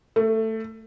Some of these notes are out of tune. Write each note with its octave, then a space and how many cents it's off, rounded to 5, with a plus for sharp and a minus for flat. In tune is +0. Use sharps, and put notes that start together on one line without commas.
A3 +15